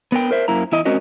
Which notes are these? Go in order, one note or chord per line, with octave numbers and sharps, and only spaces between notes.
B3 A#4 G5
A#4 C5 E5
F#2 A#3 E4 A#5
E2 E4 D#5
G#3 C4 C#4 F#4 A#4 D#5